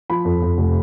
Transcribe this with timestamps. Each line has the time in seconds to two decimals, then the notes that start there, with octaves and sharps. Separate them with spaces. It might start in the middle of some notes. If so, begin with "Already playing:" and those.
0.10 F3 B5
0.25 F2
0.42 F2
0.58 F1